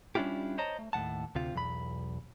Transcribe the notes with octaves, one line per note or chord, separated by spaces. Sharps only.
G3 C#4 D4 E4 F4 G4
C5 C#5 D#5 A5 A#5
A3
D#2 A2 E3 F#5 A5
D2 C3 F4
B1 E2 B5